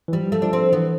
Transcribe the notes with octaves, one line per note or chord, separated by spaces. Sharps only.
E3
F3 G3
A3
F3 D4
C4
E3 B3